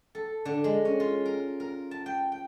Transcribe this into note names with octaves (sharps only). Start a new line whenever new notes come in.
A4
D3
G#3
C#4
F4
A#4
A#4
A5
G5
G5